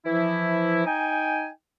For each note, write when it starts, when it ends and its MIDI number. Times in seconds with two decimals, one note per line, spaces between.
0.06 0.86 52
0.06 0.86 53
0.06 0.86 64
0.86 1.49 63
0.86 1.49 79
0.86 1.49 80